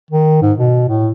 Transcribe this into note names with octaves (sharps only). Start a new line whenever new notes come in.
D#3
G#2
B2
A2